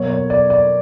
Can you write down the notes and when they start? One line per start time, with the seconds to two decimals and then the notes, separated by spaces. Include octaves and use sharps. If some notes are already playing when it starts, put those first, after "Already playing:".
Already playing: B2 F#3 A#3 C#5
0.10 C#5
0.30 D5
0.50 D5